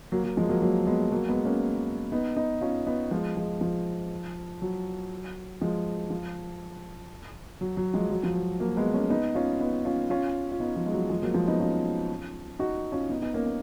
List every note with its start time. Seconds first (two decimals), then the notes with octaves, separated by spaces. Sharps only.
0.12 F#3 A#3
0.24 F#3
0.37 F3 G#3
0.49 F#3 A#3
0.62 F#3 A#3
0.87 G#3 B3
1.12 F#3 A#3
1.29 G#3 B3
1.45 A#3 C#4
2.12 B3 D#4
2.37 B3 D#4
2.61 C#4 F4
2.86 B3 D#4
3.11 F3 G#3
3.36 F3 G#3
3.61 F3
4.62 F#3
5.61 F3 G#3
6.10 F3
7.61 F#3
7.77 F#3
7.94 F3 G#3
8.10 F#3
8.23 F3
8.36 F#3
8.60 F#3 A#3
8.77 G#3 B3
8.94 A#3 C#4
9.10 B3 D#4
9.35 C#4 F4
9.60 B3 D#4
9.85 C#4 F4
10.10 C#4 F4
10.52 F4
10.60 B3 D#4
10.76 F3
10.86 G#3
10.93 F#3
11.09 F3 G#3
11.22 F#3 A#3
11.34 F3 G#3
11.47 B3 D#4
11.60 C#4 F4
12.59 D#4 F#4
12.92 C#4 F4
13.09 B3 D#4
13.22 B3 D#4
13.34 A#3 C#4
13.46 A#3